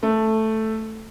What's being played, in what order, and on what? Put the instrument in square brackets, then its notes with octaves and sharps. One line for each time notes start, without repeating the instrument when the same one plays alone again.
[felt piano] A3